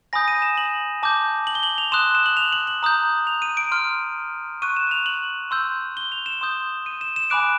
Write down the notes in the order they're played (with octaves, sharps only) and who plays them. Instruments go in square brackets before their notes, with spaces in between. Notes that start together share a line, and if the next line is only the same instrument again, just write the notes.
[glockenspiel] G#5 B5 D#6 G6 A#6
D#7
E7
F#7
A5 D6 G6
F#7
G7
F#7
F7
C6 D#6 F#6 E7
E7
F#7
F7
F#7
F#7
A#5 D#6 G6
F7
D#7
D7
C6 F6
C#6 F#6 D#7
E7
F7
F#7
C6 E6 G6
G7
F7
E7
C6 D#6 G6
D#7
E7
E7
G#5 B5 D6 F#6 D7